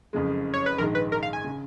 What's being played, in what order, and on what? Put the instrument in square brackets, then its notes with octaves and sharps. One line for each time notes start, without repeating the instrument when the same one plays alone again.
[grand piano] F#1 F2 C#3 G#3
[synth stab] C#5
B4
[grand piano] A#1 G#2 D#3 G#3 [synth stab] A#4
[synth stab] B4
A#4
F5
G#5
[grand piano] C#3